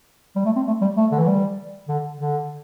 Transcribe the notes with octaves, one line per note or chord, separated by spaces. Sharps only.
G3
A3
C4
A3
G3
A3
D3
E3
G3
D3
D3